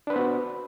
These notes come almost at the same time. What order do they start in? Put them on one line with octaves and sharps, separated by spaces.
D4 B4 C5 B3 F#4